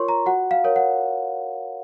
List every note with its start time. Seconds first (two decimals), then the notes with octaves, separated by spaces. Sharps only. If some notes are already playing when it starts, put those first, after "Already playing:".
Already playing: F4 A#4 C#5 C6 C#6
0.09 A#5
0.26 F#4 F#5
0.51 F5
0.64 A#4 C#5
0.76 F#5